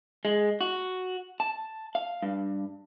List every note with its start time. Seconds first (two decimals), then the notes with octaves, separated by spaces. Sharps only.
0.25 G#3
0.61 F#4
1.40 A5
1.95 F5
2.22 G2